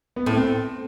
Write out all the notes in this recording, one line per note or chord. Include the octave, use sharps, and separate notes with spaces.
B3
A2 C4
C4